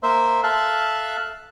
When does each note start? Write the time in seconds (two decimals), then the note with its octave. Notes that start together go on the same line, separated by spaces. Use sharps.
0.03 A#3 C5 E5
0.43 A4 E5 F5 A5 F#6